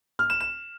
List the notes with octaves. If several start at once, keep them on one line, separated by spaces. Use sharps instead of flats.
F6
E7
E7